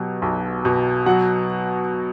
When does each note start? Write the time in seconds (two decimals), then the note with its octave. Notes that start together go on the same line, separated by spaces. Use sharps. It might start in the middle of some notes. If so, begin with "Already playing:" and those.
Already playing: B2 F#3 G4
0.22 B1
0.65 B2
1.06 F#3 F#4 F#5